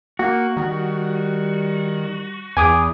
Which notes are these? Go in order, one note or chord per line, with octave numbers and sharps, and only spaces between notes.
A#3 F#4
D#3 G3
E2 G#5 D6 D#6